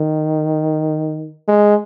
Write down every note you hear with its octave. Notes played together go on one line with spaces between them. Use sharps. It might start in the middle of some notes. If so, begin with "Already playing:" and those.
Already playing: D#3
G#3